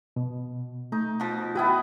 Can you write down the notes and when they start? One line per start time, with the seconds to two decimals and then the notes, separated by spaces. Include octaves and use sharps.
0.16 B2
0.92 A3 D#4
1.20 B2 F3
1.55 B3 E4 F#4 B4 G5 D#6